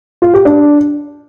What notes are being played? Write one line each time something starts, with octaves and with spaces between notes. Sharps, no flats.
F4
G4
D4